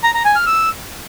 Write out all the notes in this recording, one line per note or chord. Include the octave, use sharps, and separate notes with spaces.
A#5
A#5
G#5
F6
E6